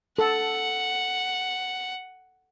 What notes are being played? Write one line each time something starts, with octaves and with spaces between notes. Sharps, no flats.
A4 F#5